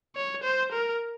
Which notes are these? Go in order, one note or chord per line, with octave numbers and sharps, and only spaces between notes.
C#5
C5
A#4